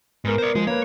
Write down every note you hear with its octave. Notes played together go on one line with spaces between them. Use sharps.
G#2 B3 A#4
C5 D5
F3 G#3
A#3 B4 C#5